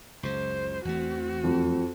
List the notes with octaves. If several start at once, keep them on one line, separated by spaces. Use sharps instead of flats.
C#2 F#2 C#3 C5
E2 E3 A3 C4 F#4
F2